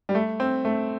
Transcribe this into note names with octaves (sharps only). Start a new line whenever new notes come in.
G3
A3
C4
A3